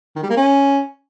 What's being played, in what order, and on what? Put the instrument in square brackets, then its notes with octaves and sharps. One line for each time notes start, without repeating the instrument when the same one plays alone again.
[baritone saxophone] D#3
G3
A#3
C#4